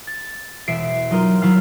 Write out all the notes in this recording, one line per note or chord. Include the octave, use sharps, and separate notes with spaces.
A6
E1 E5 C7 D7
F#3 D#4 F4 A#4
F#3 E4 F5 F6